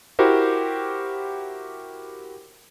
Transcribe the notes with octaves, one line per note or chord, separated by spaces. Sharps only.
E4 F#4 G4 A#4 C5